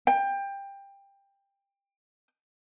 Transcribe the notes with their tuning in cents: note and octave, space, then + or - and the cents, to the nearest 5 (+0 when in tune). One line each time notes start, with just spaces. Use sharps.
G5 +20